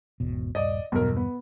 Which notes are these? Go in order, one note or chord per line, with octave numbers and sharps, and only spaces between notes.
G#1 E2 B2
D#1 G2 D5 D#5
B1 E2 G2 B2 A#4
B3